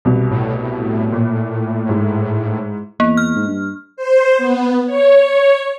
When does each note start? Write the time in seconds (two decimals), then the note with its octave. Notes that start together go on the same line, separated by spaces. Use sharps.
0.05 C2 B2
0.31 A2
1.12 A#2
1.89 G#2 E4
3.00 E2 A#3
3.17 F6
3.36 G#2
3.47 G2
3.97 C5
4.38 B3
4.87 C#5